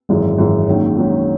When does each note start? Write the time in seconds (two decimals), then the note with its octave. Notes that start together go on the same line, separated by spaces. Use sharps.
0.09 G#1 F#2 E3 G#3
0.38 G#1 F#2 E3 G#3
0.67 A#1 G#2 D#3 F#3 C#4
0.96 A#1 G#2 D#3 F#3 C#4